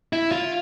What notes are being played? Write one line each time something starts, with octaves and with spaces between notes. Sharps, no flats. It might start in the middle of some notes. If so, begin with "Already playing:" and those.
E4
F4